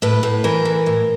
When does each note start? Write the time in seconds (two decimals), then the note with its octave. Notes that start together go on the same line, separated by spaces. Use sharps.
0.02 A2 B4
0.23 A2
0.44 E3 A#4
0.65 E3
0.86 A2